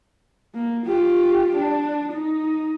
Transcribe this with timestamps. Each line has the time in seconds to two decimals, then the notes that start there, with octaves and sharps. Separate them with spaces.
0.54 A#3
0.85 F4 G4
1.55 D4
2.12 D#4